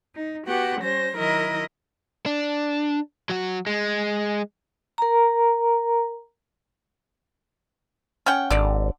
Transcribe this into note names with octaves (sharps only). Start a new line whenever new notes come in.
D#4
B3 F#4 G4 F#5
G3 C#4 C5 A#6
D#3 F#3 E4 A#4 D#5 A#6
D4
F#3 F#4
G#3
A#4 A#5
C#4 F#5 G5
G#1 D3 D5